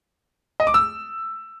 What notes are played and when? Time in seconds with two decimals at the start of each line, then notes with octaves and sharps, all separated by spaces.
0.60 D#5
0.67 D6
0.74 E6